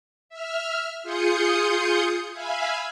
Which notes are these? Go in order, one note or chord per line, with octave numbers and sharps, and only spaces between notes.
E5 F6
F4 G#4 C6 D#6 G6 C#7
E5 F5 G#5 B5